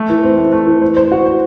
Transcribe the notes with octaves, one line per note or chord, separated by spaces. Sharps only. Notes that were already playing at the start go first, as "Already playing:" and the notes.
Already playing: A3
E3
C4
A3
A3
E3
C5
C5
F#4
C5